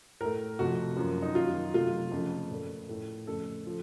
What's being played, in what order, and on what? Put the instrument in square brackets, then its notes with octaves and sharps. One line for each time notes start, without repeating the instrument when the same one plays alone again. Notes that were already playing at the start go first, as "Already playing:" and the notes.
[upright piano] A2 A3 A#4
F2 C3 F3 A3 F#4
F#2 F3 A#3
D#4
F#2 D#3 A#3 F4
C3 F#3 A3 F4
F2 C#3 A3
A#2 A3
A2 A3
F2 C#3 A3 A4
F3